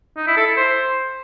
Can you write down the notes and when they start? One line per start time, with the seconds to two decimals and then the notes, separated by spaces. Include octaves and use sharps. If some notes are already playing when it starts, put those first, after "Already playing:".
0.17 D#4
0.27 E4
0.37 A4
0.47 E4
0.57 C5